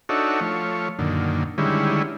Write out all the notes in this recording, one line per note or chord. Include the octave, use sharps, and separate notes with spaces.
D4 D#4 F#4 A4 C#5 E5
F3 A3 C#5
F#2 A#2 D3 D#3
D3 D#3 G3 G#3 C#4 E4